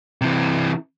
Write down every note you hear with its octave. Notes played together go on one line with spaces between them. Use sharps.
C3 E3